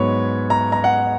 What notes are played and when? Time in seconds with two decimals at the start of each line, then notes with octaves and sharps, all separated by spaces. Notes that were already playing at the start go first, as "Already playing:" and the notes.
Already playing: G#2 F#3 B3 C#5
0.50 A#5
0.72 A#5
0.84 F#5